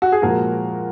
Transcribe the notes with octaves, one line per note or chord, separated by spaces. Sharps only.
F#4
G#4
A#2 F3 G#3 F#4 A#4